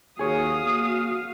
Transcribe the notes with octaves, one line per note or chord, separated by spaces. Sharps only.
D#2 F#4 G#4 C#5 F5 D#6
A#3